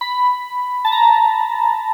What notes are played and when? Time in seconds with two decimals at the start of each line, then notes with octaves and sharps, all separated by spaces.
0.01 B5
0.85 A5
0.92 A#5